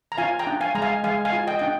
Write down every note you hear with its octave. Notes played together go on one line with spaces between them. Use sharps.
A#5
F4 F5 G#5
G5 A#5
D4
F5 G#5
G#3 A#5
F5 G#5
G#3 F5 G#5
F5 G#5
F4
D#5 G5
D4 G5